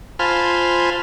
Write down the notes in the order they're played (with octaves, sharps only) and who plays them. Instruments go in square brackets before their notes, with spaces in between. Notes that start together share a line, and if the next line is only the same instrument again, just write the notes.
[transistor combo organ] F4 C5 G#5 A5 B5 F6